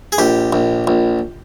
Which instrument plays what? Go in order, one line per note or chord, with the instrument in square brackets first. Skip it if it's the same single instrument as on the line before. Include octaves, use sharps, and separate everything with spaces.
[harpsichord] G#4
A#1 G4
A#1
A#1